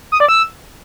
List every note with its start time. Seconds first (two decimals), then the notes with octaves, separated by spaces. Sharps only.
0.12 D#6
0.20 D5
0.28 E6